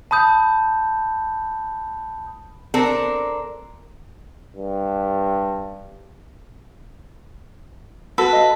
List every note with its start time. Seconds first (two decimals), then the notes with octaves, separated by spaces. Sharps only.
0.11 A5 B5 D#6 G6
2.74 C4 D4 A4 A#4
4.56 G2
8.18 F#4 A4 B4
8.32 D#5 F5